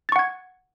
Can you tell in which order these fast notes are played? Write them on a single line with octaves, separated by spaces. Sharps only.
A6 C#6 F#5 G#6